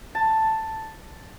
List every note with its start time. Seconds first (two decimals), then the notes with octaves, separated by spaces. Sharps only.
0.15 A5